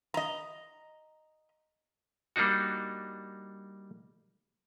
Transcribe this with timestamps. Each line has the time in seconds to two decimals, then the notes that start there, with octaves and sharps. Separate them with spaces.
0.14 D#5 A#5
2.36 G3 A#3 D4 D#4 F#4